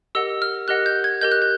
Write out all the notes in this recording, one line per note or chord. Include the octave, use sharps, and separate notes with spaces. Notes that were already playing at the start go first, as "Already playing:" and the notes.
G4 A#4 D#5 F#5 E6
F6
G4 A#4 D#5 F#5 F#6
G6
G#6
G4 A#4 D#5 G6
F#6
G6